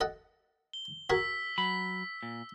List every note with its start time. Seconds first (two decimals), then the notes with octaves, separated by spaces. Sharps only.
0.01 A4 D#5 F#5
0.73 G7
1.10 F#4 G#4 A#4 E6 B6
1.58 F#3 B5 B6
2.23 A#2